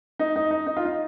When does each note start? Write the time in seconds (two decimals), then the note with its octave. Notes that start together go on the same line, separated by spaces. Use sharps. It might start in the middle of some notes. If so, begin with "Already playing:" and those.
0.19 D#4
0.36 D#4
0.51 D#4
0.67 D#4
0.77 F4
0.85 D#4